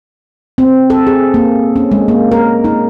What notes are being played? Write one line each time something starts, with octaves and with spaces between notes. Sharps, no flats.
C4
A4
G#4
A#3
C#4
G#3
A#3
A#4
D#4